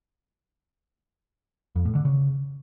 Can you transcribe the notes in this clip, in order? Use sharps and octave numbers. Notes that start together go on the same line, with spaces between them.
F2
A2
D3
C#3